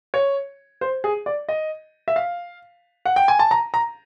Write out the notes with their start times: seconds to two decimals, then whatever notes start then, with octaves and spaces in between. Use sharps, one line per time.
0.14 C#5
0.81 C5
1.04 G#4
1.26 D5
1.48 D#5
2.08 E5
2.16 F5
3.05 F#5
3.16 G5
3.28 G#5
3.39 A5
3.51 A#5
3.74 A#5